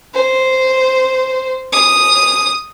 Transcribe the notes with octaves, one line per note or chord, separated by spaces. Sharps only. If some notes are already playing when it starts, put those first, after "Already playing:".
C5
D#6